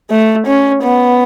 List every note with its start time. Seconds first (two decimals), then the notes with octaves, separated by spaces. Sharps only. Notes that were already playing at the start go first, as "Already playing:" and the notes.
0.11 A3
0.47 C#4
0.83 B3